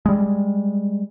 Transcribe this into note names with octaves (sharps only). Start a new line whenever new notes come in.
G3 G#3